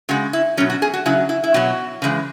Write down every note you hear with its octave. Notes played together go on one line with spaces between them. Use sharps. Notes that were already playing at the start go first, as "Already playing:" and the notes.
C#3 G#3 F#4
E4
B2 F#3 C#4
F#4
G#4
F#4
C#3 F#3 E4
E4
E4
B2 F#3 F#4
C#3 E3 G#3